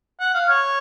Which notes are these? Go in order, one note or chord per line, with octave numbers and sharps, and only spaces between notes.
F#5
F5
C#5